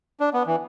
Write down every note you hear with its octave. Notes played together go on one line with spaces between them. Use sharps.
D4
B3
E3